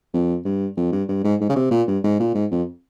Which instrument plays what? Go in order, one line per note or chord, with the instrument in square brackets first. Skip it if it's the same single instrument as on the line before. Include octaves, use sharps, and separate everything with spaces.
[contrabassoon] F2
G2
F2
G2
G2
G#2
G#2
C#3
C3
A#2
G2
G#2
A#2
G#2
F2